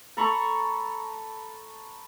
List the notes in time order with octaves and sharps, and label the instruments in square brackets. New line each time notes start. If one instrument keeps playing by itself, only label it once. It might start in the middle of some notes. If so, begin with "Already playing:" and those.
[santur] A4 A#5 B5 C#6